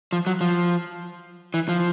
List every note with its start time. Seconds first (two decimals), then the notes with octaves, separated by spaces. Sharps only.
0.13 F3
0.27 F#3
0.41 F3
1.54 E3
1.69 F3